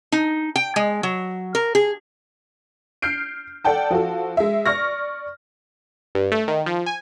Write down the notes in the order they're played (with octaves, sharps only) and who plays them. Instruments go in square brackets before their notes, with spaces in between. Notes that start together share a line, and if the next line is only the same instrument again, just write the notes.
[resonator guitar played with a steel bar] D#4
G5
G#3
F#3
A#4
G#4
[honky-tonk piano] F6 G6 C7 D7
A4 D5 F#5 G5 A5
F3 F#4 A4
G#3 E5
D5 C#6 F6 A#6
[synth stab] G2
A3
D#3
F3
G#5